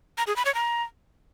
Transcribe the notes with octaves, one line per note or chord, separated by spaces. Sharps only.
A#5
G#4
B5
C#5
A#5